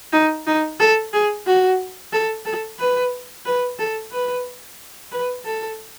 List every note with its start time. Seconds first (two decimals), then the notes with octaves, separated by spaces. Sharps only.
0.13 D#4
0.47 D#4
0.80 A4
1.13 G#4
1.46 F#4
2.13 A4
2.45 A4
2.79 B4
3.46 B4
3.79 A4
4.11 B4
5.12 B4
5.45 A4